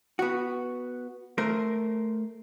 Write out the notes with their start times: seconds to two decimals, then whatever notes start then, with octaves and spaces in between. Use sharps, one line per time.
0.19 B3 F#4
1.38 A3 A#4 C5